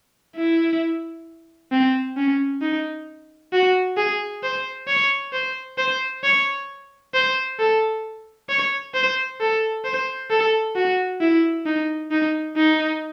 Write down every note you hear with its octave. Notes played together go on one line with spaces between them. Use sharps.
E4
C4
C#4
D#4
F#4
G#4
C5
C#5
C5
C5
C#5
C5
A4
C#5
C5
A4
C5
A4
F#4
E4
D#4
D#4
D#4